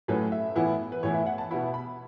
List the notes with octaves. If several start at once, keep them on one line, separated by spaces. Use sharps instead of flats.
A2 F#3 A3 C#4 B4
E5
A2 E3 B3 E4
B4
A2 E3 B3 E4 C#5
E5
F#5
A5
B2 B3 E4 B5
B5